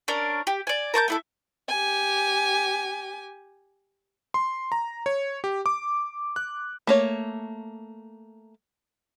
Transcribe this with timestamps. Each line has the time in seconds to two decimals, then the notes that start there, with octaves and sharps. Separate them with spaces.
0.08 C#4 D4 A#4
0.47 G4
0.67 D5 G#5
0.94 A#4 A5 C#6 G6
1.08 A3 E4 A4
1.68 G4 G#5
4.34 C6
4.72 A#5
5.06 C#5
5.44 G4
5.66 D6
6.36 F#6
6.87 A3 A#3 C#5